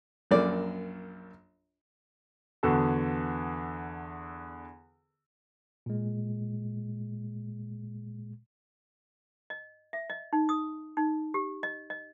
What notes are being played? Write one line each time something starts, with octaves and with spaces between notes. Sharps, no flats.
A#1 F#2 A#3 D5
E2 D3 B3 F#4 A4
A#2 G#3
D#5
E5
D#5
D#4
D#6
D#4
G4
D#5
D#5